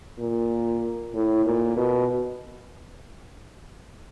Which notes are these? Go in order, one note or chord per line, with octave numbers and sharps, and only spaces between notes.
A#2
A2
A#2
B2